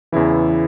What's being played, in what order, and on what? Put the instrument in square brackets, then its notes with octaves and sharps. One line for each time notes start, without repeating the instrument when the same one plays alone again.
[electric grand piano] E2 C#3 E3 E4